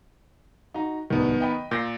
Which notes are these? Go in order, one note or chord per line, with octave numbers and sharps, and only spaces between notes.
D#4 F#4 A#5
D1 C2 D#3 G3 B3
D#5 G5 B5
A#2 G6 A#6 C7